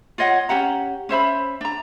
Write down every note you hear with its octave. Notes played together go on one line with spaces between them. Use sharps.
F4 C#5 D#5 F#5
C#4 G4 F#5 A#5
C#4 C5 E5 B5
D4 A#5